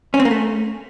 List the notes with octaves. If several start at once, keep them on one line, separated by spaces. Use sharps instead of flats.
C#4
C4
A#3
A3